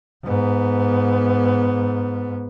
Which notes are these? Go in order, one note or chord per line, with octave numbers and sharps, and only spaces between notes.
G#2 B3